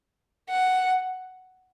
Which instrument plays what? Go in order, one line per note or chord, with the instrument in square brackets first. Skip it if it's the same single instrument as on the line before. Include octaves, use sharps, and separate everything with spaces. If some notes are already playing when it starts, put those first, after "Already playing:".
[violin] F#5